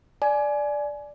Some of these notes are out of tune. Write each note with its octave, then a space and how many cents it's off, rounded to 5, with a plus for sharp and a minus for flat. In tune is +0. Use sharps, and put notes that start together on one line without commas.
D5 +0 G#5 +20